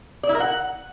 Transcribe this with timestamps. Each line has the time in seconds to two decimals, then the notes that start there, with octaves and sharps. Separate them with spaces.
0.23 D5
0.29 E4
0.35 A#4
0.40 F#5